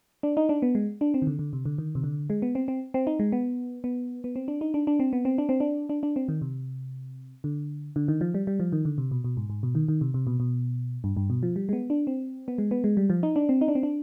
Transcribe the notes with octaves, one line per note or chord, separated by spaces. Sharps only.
D4
D#4
D4
B3
G#3
D4
C4
D#3
D3
D3
C3
D3
D#3
C3
D3
G#3
B3
C4
C4
C4
D#4
G#3
B3
B3
B3
C4
D4
D#4
D4
D4
C4
B3
C4
D4
C4
D4
D4
D4
C4
D#3
C3
D3
D3
D#3
F3
G3
G3
F3
D#3
D3
C3
B2
B2
G#2
G#2
B2
D#3
D#3
C3
C3
B2
B2
G2
G2
B2
F3
G3
G#3
B3
D4
C4
B3
G#3
B3
G#3
G3
F3
D#4
D4
C4
D#4
D4
C4
D4